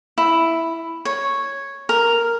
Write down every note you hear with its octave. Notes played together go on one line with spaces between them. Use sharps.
E4
C#5
A#4